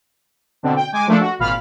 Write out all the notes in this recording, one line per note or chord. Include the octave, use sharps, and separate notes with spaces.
B2 D3 C4 D4
G5
G#3 G#5 D6
F3 A3 A#3 D4 A4
F#4
G#1 A#2 F5 B5 F6